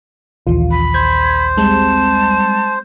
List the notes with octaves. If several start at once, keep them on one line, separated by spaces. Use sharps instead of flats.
A#1 D#2 E3 F4
B5
C5 G#6
G3 G#3 C4 A5